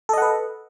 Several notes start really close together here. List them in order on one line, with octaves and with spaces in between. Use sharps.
A4 D#5 F#5 B4